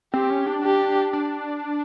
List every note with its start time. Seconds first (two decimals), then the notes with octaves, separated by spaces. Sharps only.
0.14 C4 G4
0.30 C#4
0.46 D4
0.64 G4
1.13 D4